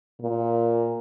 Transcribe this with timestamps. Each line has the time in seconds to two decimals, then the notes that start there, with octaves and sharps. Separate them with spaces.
0.21 A#2